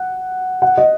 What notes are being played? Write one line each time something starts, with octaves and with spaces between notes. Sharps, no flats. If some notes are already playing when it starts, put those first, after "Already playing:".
Already playing: F#5
F#5
D#5